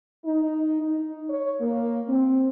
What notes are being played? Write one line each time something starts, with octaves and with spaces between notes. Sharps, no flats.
D#4
D#4
C#5
A#3
C4